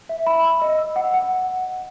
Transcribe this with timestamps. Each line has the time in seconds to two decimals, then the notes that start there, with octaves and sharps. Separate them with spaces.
0.09 E5
0.27 B5
0.44 E6
0.62 D#5
0.79 E6
0.96 F#5
1.14 F#5